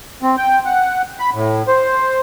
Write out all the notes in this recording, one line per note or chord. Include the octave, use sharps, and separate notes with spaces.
C4
G5
F#5
B5
A2
C5